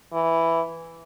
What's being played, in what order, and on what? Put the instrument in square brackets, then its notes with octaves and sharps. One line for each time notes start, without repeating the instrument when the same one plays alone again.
[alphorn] E3